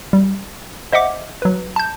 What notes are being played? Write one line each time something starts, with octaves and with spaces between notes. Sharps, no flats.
G3
C5 D#5 E5 F#5 D6
F#3 B4
A5 G6